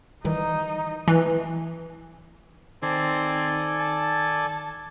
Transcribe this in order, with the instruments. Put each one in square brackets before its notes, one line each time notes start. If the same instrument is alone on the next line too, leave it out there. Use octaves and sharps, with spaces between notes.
[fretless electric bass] D#3 E3 G3 [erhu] D#4
[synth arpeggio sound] E3
[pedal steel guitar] D#3 [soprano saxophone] C4 [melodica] A4 D5 G#5
[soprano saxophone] A5